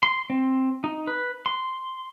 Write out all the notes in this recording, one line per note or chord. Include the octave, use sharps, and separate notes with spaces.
C6
C4
D#4
B4
C6